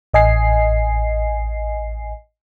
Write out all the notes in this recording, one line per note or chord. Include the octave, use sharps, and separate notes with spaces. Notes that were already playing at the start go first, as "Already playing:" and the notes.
A1 D#5 G#5 C7